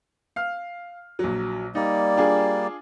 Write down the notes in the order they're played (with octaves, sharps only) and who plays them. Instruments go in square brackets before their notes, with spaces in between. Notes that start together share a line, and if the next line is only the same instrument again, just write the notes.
[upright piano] F5 F6
A#1 F#3
[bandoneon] G3 A#3 D5 [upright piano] D#4
[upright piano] D4 F4 G#4